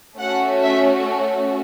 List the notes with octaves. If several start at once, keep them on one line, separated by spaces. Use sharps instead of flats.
A3 C#4 F#4 F#5
E5